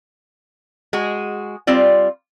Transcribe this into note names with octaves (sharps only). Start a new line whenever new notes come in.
G#3 F#4 G#4
G3 C4 F4 D5